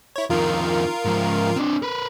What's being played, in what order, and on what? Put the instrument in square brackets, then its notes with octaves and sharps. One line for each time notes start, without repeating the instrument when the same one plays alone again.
[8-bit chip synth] E4 C#5
[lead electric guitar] F2 D#3 [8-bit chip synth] F4 A#4
[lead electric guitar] G#2 F3
C4 D4
A#4 B4